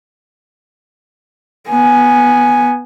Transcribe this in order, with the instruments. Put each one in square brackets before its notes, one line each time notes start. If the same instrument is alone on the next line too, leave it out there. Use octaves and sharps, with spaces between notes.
[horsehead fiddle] B3 G#5